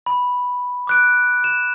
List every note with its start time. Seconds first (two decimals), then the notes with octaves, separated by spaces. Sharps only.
0.06 B5
0.87 D6 F#6 D7
1.44 E7